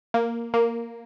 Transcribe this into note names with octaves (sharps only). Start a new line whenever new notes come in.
A#3
A#3